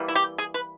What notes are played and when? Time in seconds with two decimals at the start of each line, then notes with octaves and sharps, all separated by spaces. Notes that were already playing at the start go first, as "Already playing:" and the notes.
Already playing: E3 G3 A#3
0.08 E4
0.15 G4
0.38 G#4
0.54 B4